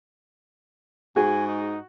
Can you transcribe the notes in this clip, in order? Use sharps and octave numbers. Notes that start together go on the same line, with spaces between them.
G#2 F#4 G#4 G#5
D#4